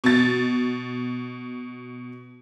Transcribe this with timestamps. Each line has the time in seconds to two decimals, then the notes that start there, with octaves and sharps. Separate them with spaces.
0.04 B2 A6